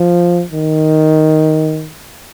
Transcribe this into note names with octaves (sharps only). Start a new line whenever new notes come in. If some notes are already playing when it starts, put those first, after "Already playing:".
Already playing: F3
D#3